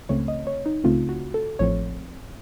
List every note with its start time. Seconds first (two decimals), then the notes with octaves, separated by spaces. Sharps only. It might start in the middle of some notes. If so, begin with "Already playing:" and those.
0.09 C#2 C#3 A3 C4 C#5
0.28 D#5
0.47 C#5
0.66 D#4
0.84 C#2 C#3 A3 C4 F4
1.09 F#4
1.34 A4
1.59 A1 A2 F3 C4 C#5